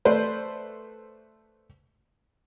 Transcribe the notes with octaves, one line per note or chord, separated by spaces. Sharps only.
A3 B4 C5 D5